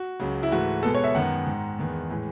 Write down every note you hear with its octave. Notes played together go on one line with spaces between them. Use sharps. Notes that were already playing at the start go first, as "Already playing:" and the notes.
Already playing: F#4
C#2 C#3 F#3
E4
G#2 E3 A3 F#4
B2 G#3 B3 A4
C#5
E5
F#2 D#3 G#3 B3 F#5
G#2 D#3 G#3
E2 D#3 G#3 B3
A2 E3 G#3